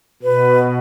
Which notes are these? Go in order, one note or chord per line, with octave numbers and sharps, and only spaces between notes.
B2 B4